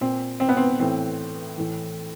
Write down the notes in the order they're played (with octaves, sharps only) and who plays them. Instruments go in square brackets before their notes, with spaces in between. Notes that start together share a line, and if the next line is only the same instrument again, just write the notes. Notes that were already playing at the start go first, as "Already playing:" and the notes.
[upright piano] A#2 C4
C4
B3
C4
A2 E3 C4
A2 E3